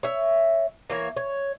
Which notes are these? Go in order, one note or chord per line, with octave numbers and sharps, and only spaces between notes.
C#5 E5
E3 A#3 C#5
C#5